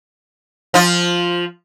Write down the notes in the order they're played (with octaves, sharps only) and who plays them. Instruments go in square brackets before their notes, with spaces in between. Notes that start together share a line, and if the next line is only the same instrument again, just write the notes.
[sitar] F3 F4